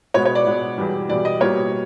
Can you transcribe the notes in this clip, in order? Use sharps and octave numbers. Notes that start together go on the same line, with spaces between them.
B2 G#3 B3 C#5
C#5
D5
B2 G#3 B3
E2 B2 G3
E2 B2 G3 D5
D#5
B2 G3 A#3 C#5